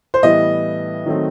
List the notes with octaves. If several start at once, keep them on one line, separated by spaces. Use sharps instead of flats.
C5
A2 E3 G3 B3 D#5
D#3 F#3 A3 C4